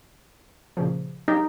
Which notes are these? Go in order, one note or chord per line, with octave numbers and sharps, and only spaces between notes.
A#2 C#3 F3
F#3 D#4 G4